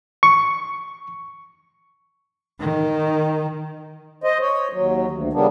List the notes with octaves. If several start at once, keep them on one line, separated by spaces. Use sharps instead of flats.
C#6
D#3
C5 D#5
C#5
D#2 F#3
D2
C#3 G3 A#3 B3 D4